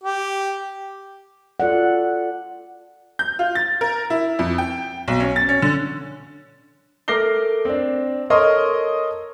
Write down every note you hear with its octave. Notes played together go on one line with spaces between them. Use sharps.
G4
F4 A4 D5 F#5
G6
F4
A6
A#4
E4
F2
G5
B1
C#4
A6
C#4
D3
A3 A#4 D6 A#6 C7 G7
C4 D4
A4 A#4 C#5 D#5 C6 C#6